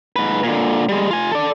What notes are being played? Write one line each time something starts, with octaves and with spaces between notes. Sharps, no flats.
G#2 B4
A#2 D3
G3 G#3
F4 G#5
A4 D5